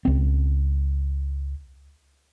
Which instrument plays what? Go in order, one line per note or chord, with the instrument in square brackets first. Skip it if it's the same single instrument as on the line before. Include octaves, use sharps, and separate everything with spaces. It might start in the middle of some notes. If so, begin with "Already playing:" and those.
[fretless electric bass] C#2 C4